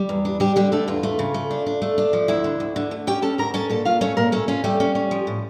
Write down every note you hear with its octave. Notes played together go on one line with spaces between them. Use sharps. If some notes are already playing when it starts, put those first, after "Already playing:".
Already playing: G3
E2
D4
G3 D4 G4
D3 G3 G4
A3 D4 A4
E2 F4
A3
C#3
A3
D4
D4
A3
D4
F3
D2 E4 E5
D3
D2
D3
A3
C#4 G4 G5
C#4 A4 A5
D2 A#4 A#5
C#4 A4 A5
A#2 A4 A5
A#2 F4 F5
A3 C#4 C#5
A#2 A#3 A#4
A3 C#4 A4
C#4 F4
G3 A3 G4
C#4
C#4
F3
A2